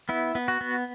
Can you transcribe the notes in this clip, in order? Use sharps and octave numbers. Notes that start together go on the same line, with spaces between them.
B3 E4
B3
F#4
B3